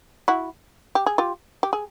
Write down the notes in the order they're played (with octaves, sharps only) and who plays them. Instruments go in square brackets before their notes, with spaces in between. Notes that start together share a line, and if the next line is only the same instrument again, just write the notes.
[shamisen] E4 F#4
G4
G#4
F4 G4
G4
G#4